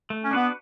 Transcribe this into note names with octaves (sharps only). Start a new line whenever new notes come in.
A3
C#4
B3 D4 F#4 B4